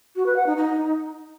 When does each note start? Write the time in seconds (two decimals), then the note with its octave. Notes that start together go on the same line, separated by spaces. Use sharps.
0.16 F#4
0.26 B4
0.36 F#5
0.46 D#4
0.56 D#4